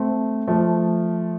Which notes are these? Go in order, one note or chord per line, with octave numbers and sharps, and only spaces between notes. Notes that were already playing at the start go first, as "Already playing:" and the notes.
Already playing: A3 C4
F3 A3